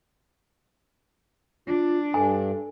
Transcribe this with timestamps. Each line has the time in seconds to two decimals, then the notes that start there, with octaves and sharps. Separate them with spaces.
1.67 D4 F4
2.14 G2 A4 G#5